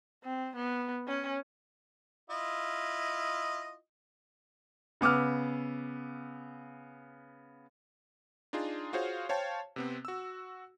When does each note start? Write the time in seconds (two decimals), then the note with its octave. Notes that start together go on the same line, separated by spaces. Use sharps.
0.24 C4
0.56 B3
1.08 C#4
2.30 E4 F4 D#5
5.01 C#3 B3 D6 E6 F6
8.53 D4 D#4 F4 G#4
8.93 F4 F#4 G#4 C5 C#5 F5
9.29 C5 C#5 F5 G5 A5
9.76 C3 B3 C4
10.05 F#4 E6